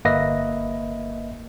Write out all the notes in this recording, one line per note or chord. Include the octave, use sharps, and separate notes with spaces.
G1 A#3 B4 D#5 E5 A#6